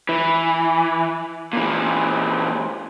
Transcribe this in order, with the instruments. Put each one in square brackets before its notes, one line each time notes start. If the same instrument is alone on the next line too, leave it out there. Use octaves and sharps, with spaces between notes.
[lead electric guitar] E3
A#2 E3